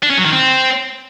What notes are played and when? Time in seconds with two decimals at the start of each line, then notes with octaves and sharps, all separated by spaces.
0.03 D4
0.10 C#4
0.18 F#3
0.25 D#3
0.32 C4